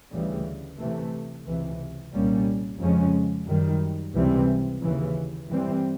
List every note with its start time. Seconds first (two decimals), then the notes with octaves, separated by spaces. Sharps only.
0.12 D2 C#3 E3 G3
0.78 C3 E3 A3
1.45 C#2 C3 E3
2.13 C2 A#2 G3 A#3 C#4
2.79 F2 C#3 F3 G#3 C#4
3.47 F#2 D#3 G3
4.13 C#2 C3 E3 G3 C4
4.82 D#2 C#3 E3
5.49 G2 E3 G3 C4